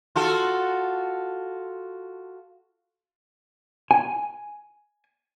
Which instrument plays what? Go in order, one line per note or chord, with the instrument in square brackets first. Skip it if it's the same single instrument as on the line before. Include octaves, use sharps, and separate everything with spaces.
[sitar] F4 F#4 A4
[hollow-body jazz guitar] G#5